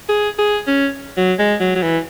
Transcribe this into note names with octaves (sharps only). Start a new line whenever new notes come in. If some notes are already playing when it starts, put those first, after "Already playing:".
G#4
G#4
C#4
F#3
G#3
F#3
F#3
E3